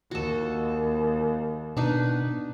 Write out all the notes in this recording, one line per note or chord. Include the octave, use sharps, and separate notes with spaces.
D#2 F#4 A4
B2 D4 D#4 B4